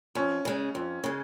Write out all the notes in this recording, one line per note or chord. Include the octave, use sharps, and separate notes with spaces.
F2 C#4
C#3 G#3
F2
C#3 G#3